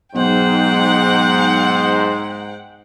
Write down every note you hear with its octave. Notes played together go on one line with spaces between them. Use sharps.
B1 G#2 C5 F#5 G5